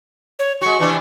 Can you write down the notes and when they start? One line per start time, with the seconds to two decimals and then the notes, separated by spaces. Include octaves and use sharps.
0.39 C#5
0.61 G#3 F#4 C#6
0.79 C3 E3 D4